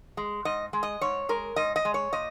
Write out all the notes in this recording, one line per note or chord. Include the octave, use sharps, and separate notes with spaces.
G#3
G#2 D#5
G#3
D#5
G#2 C#5
G#3 A#4
G#2 D#5
D#5
G#3
C#5
A#2 D#5